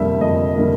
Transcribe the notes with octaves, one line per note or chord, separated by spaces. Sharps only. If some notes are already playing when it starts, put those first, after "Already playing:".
Already playing: F2 D3 G3 A#3 E5
F2 D#5
D3 G3 A#3